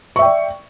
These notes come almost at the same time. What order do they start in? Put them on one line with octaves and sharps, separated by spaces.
C#6 E5 G5 D5